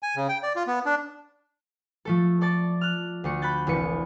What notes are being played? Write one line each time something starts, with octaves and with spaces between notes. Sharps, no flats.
G#5
C#3
G5
D5
F4
B3
D4
F3 A3 A4
A4 D5 A5 A6
F6 F#6
D2 A3 C#7
B5 F#6 G6 A6
E1 C2 B4 C#7